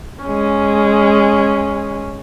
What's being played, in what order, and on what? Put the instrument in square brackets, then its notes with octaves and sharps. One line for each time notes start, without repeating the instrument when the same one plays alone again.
[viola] G#3 C#4